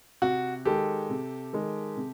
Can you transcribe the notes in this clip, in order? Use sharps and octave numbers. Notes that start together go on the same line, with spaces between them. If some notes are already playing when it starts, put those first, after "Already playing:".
C3 F#4
D#3 G#3 G4 A4
C3
D#3 G#3
C3